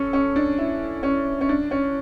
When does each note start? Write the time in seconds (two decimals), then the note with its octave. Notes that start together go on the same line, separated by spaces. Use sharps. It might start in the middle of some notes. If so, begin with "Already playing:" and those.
Already playing: C#4 A4
0.13 C#4
0.36 D4
0.58 E4
1.03 C#4
1.41 C#4
1.49 D4
1.71 C#4